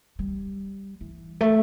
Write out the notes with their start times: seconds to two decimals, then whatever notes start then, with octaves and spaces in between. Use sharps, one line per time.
0.19 G3
1.01 E3
1.41 A3